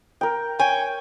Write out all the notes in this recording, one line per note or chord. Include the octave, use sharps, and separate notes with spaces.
A#4 G5
C#5 G5 G#5